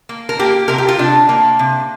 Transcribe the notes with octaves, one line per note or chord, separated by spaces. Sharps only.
A#3
A#4
A#3 G4
C3 A#4
G4
F4
C3 D4
A#3
C3